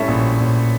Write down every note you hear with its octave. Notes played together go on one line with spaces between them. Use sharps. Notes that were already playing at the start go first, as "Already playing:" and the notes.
Already playing: A2 G3 C#4 A4 E5
A#1
A#1